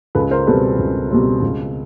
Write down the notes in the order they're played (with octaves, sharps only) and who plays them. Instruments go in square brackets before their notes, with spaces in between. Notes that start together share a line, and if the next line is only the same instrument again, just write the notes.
[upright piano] C#2 A4 B4
A#4 C5
B2 G3 C4 A4 B4
C#2
B2 G3 C4
C#2